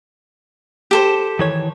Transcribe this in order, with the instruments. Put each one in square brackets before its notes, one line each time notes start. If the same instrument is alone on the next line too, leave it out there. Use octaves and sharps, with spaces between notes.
[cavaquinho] G4 A4 C5
[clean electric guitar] D#3 E3 C#5